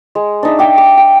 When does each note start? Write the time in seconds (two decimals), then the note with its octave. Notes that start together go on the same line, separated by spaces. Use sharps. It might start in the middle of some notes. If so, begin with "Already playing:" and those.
0.15 G#3
0.43 D4 D#4 E5
0.59 E5 G5 D6
0.78 D6
0.97 G5